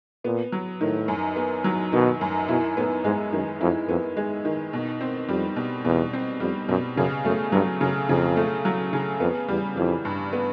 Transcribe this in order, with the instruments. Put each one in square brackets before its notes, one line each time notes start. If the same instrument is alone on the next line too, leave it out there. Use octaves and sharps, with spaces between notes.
[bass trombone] A#2 [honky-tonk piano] B3
[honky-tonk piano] F#3
[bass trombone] A2 [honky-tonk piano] D#3
[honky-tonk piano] F#2
B3
F#3
[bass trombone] B2 [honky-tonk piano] D#3
[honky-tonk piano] F#2
[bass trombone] B2 [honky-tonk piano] E4
[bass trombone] A2 [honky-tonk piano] B3
[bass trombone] G#2 [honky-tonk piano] G#3
[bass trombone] F#2 [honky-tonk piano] D#3
[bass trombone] F2 [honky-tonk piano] E4
[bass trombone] F2 [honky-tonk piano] B3
[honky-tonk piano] G#3
D#3
B2
C4
[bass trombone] F2 [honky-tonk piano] G3
[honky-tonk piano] B2
[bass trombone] E2 [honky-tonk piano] B2
[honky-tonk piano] C4
[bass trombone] F2 [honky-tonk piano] G3
[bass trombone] F#2 [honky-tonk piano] B2
[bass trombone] F#2 [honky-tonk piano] C#3
[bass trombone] F#2 [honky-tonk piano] A3
[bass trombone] G2 [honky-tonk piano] F#3
[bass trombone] F#2 [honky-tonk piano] C#3
[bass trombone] F2 [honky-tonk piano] C#3
[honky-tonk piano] A3
F#3
C#3
[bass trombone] F2 [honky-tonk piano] B3
[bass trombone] E2 [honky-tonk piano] G3
[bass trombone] F2 [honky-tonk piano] E3
[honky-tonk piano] G2
B3